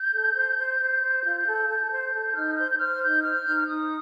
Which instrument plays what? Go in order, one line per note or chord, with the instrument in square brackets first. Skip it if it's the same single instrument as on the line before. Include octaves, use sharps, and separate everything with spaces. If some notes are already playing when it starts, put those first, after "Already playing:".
Already playing: [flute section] G6
A4
C5
C5
C5
C5
F4
A4
A4
C5
A4
D#4 F6
C5 G6
G6
C5 F6
D#4 G6
C5 F6
D#4 G6
F6
D#4 D#6